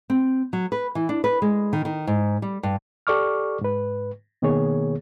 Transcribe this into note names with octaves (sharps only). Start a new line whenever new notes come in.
C4
F#3
B4
E3
D4
B4
G#3
D#3
D#3
G#2
G3
G2
G4 A4 D5 C#6 D6 F6
G#2 B4
B2 D#3 A#3 B3 G#4 C#5